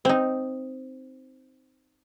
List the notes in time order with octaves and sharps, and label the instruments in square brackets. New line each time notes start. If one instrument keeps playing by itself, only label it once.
[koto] C4 D#4